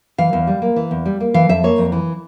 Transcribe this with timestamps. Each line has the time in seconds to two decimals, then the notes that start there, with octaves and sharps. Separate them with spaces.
0.18 E3 F5
0.33 E2
0.47 G3
0.62 A#3
0.76 E3
0.91 E2
1.06 G3
1.20 A#3
1.34 E3 F5
1.49 F2 E5
1.64 A#3 C#5
1.78 F2
1.92 E3